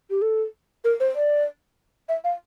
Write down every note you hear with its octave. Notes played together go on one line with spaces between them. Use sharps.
G4
A4
A#4
C5
D5
E5
F5